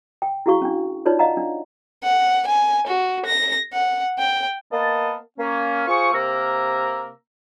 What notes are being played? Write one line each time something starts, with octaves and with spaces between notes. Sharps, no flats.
G5
E4 F#4 G#4 F5 C#6
C#4 D4
D#4 F4 B4 C#5 D5
D#5 F5 F#5 A#5
D4
F#5
G#5
F#4
A#6
F#5
G5
A#3 B3 D#5 A5
A#3 C#4
F4 G#4 C5 C#6
C3 A#3 A#4 A#5 E6